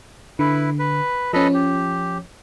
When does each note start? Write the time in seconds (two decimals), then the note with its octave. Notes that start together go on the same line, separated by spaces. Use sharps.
0.39 D3 E4 B4
0.79 B4
1.33 F3 C#4 A4 B4 D#5
1.54 G4